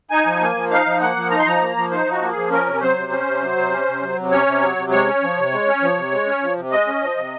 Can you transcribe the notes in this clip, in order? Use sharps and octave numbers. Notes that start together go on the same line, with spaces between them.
D#4 G#5
F3
A#3
F3
D#4 F5
F3
A#3 F#5
F3
D#4 A#5
C6
F3 A#5
A#3
F3
D#4 C5
F3
F#4
A#3
G#4
F3
C#4 A#4
C3
F#3 C5
C3
C#4
C3
F#3
C3
C#4
C3
F#3
C3
C#4 C#5
C3
F#3
C3
G#3 C#5
C#4
F3
C3
G#3
C#4
F3
C3
G#3
C#4
F3
C3
G#3 D#5
C#4
F3
C3